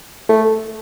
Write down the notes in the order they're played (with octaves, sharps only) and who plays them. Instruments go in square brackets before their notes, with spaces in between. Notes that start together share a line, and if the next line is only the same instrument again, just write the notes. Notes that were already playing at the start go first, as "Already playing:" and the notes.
[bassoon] A3